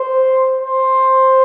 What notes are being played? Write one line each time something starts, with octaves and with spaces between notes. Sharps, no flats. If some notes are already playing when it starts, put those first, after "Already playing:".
Already playing: C5
C5